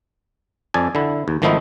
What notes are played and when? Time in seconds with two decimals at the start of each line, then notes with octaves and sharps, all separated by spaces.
0.74 F2 D5 G#5 A5
0.95 D3 E4
1.28 D#2
1.42 G#1 D#3 F3 A3 D#4 E4